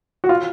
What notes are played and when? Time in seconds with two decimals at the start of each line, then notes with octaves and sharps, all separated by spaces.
0.24 F#4
0.29 F4